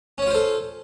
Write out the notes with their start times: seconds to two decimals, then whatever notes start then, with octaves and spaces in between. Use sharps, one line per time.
0.18 C#4
0.22 C#5
0.26 F4
0.31 C5
0.35 A4